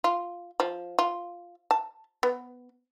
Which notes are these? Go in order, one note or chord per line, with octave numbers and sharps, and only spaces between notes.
F4
F3
F4
A5
B3